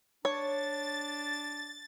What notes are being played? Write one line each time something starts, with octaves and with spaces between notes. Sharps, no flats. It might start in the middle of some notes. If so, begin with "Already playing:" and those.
D4 C#5 A6